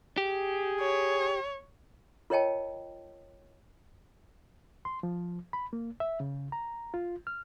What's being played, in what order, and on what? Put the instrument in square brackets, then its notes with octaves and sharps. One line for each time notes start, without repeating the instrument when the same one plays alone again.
[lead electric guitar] G4 [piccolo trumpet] G#4
[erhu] C#5
[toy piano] F4 A#4 C#5 D#5 G5 A5
[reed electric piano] C6
F3
B5
A#3
E5
C#3
A#5
F4
F6